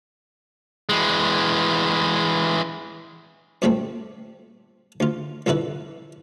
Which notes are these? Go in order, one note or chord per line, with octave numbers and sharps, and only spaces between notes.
E3 G#3
F#2 A#2 G3 A3 C4
D2 F4
C2 F2 D3 E4 B4